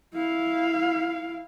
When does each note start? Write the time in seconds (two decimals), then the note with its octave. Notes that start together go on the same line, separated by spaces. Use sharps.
0.14 E4 F5